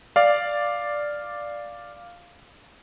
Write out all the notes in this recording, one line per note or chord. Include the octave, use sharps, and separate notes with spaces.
D5 F5